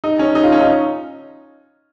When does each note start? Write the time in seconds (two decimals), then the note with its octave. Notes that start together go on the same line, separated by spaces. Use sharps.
0.04 D#4
0.19 C#4
0.35 D#4
0.43 F4
0.52 C#4
0.60 D#4